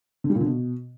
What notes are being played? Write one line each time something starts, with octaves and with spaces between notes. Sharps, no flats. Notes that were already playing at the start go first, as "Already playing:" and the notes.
D3
G3
A#2
D3
B2